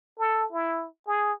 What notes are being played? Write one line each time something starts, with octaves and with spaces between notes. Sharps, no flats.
A4
E4
G#4